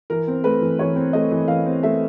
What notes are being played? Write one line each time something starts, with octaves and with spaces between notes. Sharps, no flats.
E3 A#4
C4
A3 B4
E3
E3 C#5
C4
A3 D#5
E3
E3 F5
C4
A3 E5